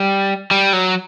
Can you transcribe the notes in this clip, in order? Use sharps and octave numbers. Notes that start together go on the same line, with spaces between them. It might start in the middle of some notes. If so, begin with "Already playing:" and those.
Already playing: G3
G3
F#3